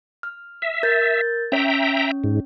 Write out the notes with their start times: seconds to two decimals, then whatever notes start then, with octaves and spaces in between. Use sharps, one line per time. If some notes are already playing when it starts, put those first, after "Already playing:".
0.23 F6
0.62 E5
0.83 A#4 G6 A6
1.52 C#4 C#5 E5 G5 A#5
2.24 G#2